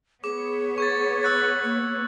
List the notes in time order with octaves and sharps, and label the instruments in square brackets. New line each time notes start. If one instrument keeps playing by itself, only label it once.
[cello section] B3 C#5 [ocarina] G#4 [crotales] D6
[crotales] C#6 G#6 A6
E6 F#6 A6
[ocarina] A#3